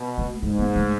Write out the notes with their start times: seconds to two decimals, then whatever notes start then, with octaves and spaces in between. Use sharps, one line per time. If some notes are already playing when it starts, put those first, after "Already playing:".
Already playing: B2
0.18 A3
0.42 G#2 G#3
0.58 B3
0.75 A3